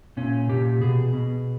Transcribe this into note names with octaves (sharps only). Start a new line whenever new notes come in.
A#2 C#4
A#2 G4
B2 G#4
B2